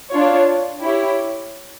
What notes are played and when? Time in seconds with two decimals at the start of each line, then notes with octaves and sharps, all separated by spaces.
0.11 D4 F4 C#5
0.81 E4 G4 C#5